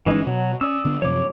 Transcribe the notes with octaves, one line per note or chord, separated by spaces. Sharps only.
G1 E3 G#3 C#4 D#4
B2 F#3
C#4 D5 D#6 E6
D3 B3 D4
F#2 C3 F3 C#5 D6